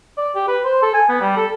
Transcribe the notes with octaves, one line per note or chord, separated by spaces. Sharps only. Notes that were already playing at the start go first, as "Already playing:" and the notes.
D5
G4
B4
C5
A4
G#5
B3
G3
A4